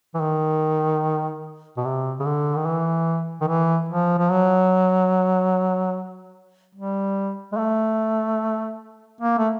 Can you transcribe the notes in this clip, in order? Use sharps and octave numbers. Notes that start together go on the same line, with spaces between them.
E3
D#3
B2
C3
C#3
D3
D#3
E3
D#3
E3
F3
F3
F#3
G3
G#3
A3
A#3
A3